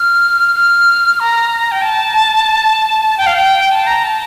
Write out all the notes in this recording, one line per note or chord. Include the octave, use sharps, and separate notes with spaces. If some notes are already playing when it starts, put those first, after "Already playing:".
Already playing: F6
F6
A#5
G5
A5
A5
G5
F5
G5
A5
A#5
A5